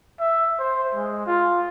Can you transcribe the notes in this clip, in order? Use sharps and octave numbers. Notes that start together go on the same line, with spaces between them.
E5
C5
G#3
F4